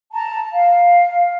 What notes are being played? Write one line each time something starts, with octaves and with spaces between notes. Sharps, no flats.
A5 A#5
F5